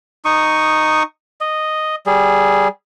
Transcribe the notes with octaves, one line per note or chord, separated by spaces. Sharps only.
D#4 C#6 D#6
D#5
G3 G#4